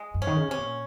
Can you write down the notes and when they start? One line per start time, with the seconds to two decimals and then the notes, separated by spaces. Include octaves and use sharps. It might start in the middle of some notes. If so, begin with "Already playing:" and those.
Already playing: G#3
0.14 G2
0.22 C#4
0.27 D#3
0.37 C#3
0.48 C3 C#4
0.58 A#2